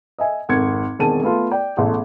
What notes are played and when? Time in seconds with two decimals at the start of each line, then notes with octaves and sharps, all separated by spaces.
0.18 D#5 E5 G#5
0.49 G#1 F2 G#6 C#7
0.99 E1 D#3 C4 A5 D#7
1.23 A3 B3 F4
1.52 D5 G5
1.77 E1 A1 A3 G#4